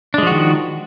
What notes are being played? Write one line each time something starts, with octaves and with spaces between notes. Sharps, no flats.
D#3 F3 G#3 D4 F#4